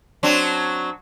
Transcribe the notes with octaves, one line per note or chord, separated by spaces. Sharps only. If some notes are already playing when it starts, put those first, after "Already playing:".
F#3 C4 D4